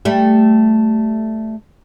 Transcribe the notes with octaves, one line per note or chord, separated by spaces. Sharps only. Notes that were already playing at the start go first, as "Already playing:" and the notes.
G3 A3